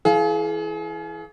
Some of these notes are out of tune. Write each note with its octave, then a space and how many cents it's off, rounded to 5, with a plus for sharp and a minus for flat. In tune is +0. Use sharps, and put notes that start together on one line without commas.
E3 +5 G#4 +35 F5 -5